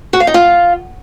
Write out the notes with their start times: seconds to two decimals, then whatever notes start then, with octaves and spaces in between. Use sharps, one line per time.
0.13 F#4
0.20 F5
0.27 D#4
0.34 F4